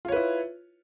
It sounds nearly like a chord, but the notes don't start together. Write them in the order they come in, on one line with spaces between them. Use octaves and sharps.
F4 C#5 B4 E4